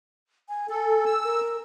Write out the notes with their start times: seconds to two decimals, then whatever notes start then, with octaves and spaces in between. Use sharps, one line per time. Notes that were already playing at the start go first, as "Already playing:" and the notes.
0.49 G#5
0.69 A4 G#5
1.06 E6
1.24 A#4